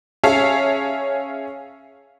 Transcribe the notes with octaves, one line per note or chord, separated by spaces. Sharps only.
C#4 G#4 C#5 E5 F5 A5